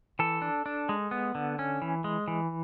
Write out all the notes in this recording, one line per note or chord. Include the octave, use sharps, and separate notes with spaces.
E3 A4
D4
D4
G#3
B3
D3
C#4
E3
G#3
E3